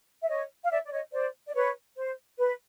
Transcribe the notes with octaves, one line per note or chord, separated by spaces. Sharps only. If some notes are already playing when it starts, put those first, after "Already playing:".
E5
C#5 D#5
F5
D5 E5
D5
C#5 D#5
C5 D5
D5
B4 C#5
C5
B4